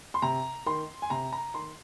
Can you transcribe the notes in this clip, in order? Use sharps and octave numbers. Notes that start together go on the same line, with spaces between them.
C6
C3 A#5
D#3 C6
G#5
C3 A#5
A#5
D#3 C6